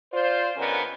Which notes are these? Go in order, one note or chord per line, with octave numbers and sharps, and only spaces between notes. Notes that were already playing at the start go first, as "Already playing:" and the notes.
F4 C5 D5
G2 D3 B3 C#4 A#4 D#5